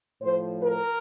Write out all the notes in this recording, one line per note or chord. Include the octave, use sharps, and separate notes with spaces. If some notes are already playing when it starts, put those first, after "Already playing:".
A2 F3 C5
A#4